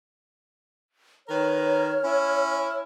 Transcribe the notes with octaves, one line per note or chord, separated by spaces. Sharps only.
D#3 A#4 B4 C#5 F6
C#4 E4